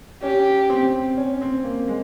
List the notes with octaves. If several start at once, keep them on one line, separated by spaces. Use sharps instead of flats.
C#4 G4
C4
C#4
C4
A#3
G#3